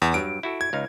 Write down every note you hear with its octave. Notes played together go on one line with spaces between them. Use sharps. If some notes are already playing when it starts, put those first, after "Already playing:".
E2
G2 F#3 D7
E4 F#4 A4
G#6
C#2 D#4 F5